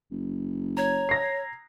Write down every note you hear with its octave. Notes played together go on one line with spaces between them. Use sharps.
F#1
C#5 A#5 G#6
A#6 C7